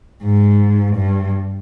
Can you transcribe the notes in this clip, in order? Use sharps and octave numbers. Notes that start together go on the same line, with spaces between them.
G#2
G2